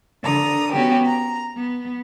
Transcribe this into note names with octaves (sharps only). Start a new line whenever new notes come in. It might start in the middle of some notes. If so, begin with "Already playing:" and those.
D3 A#5 D#6
B3 C#4 F#4 G4
A#5
B3